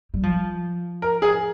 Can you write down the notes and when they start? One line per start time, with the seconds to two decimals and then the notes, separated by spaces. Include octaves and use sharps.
0.14 G3
0.23 F3
1.02 A#4
1.22 G#4